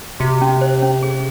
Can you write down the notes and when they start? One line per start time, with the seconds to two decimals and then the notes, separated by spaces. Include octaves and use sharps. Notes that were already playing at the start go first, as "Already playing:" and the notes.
0.20 C3 F#4
0.41 C#4
0.61 C5
0.82 C#4
1.03 G#4